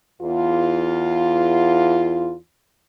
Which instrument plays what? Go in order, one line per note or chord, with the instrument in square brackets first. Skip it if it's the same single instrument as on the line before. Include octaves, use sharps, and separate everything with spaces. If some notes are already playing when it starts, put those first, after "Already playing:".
[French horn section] E2 F4